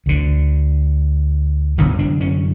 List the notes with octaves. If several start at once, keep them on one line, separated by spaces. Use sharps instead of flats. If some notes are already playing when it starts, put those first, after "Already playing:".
D2 D3
F#2 D3 B3
D4
C#4